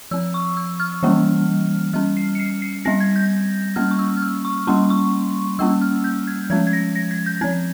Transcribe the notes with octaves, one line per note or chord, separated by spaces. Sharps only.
F3 C4 E6
C#6
E6
F6
E3 G3 A#3 C#4
G3 C#4 F6
C7
C#7
C7
C7
G3 C4 A#6
G#6
G6
G3 A#3 C#4 F6
C#6
E6
F6
E6
C#6
G3 A#3 C#4 C6
C#6
G3 A#3 C#4 E6
F6
G6
G#6
F3 G#3 C#4 G#6
G#6
A#6
A#6
G#6
G6
F3 C4 G#6